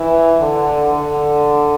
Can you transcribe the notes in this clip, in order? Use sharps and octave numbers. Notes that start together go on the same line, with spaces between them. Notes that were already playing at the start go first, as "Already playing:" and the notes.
Already playing: E3
D3
D3